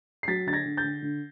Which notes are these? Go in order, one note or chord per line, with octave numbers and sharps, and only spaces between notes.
C7
F#3 A6 B6
D3 A6
G#6 A#6
D3
G6 A6
D3
D3